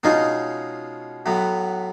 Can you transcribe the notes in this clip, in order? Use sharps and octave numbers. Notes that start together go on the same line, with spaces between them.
B2 G#3 C#4 D#4 F4 G#4
A2 F#3 B3